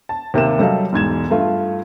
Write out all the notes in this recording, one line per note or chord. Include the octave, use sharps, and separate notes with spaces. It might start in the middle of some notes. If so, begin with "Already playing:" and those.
A5
D#2 C3 A#3 E7
F#3 G3 A4 D#5 F5
E1 G#2 G#6 E7
G2 A3 F4